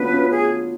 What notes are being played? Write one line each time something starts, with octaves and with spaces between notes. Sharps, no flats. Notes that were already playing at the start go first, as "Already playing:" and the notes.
Already playing: B3 C#4 D4 F4 B4
C#4 F4
G#4